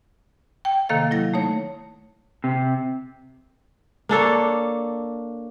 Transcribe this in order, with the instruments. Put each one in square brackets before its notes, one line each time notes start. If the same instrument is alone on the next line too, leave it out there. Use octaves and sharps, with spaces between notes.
[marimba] G5
C3 D#3 A#3 A4 F5
F#3 E4 A#6
A3 D#4 C#5
[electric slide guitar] C3
[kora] A#3 D4 A4 C#5